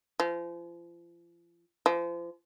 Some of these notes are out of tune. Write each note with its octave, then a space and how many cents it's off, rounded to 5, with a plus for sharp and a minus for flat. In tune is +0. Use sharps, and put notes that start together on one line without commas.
F3 -35
F3 -35